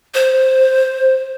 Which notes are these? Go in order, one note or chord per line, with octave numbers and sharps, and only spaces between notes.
C5